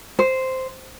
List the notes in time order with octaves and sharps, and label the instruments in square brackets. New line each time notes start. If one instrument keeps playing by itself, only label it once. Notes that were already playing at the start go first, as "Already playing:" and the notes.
[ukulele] C5